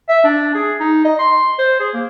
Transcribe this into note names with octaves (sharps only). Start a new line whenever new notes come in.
E5
D4
G#4
D#4
D#5
C6
C5
G#4
A#3